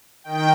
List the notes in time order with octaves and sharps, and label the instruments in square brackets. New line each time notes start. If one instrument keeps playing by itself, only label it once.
[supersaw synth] D#3 G5